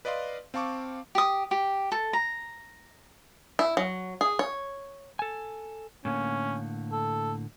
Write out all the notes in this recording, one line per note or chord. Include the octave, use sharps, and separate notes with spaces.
B4 D5 D#5 F5 C6
C4 F5 A5 C#6 D6
G4 D#6
G4
A4
A#5
E4
F#3
G#4
C#5
A4 G#5
A2 D3 A#3 C#4
A4